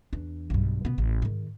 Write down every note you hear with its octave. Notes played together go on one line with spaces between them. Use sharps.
E2 D4
B1 G2
B2 B3
A1
G#2 D#3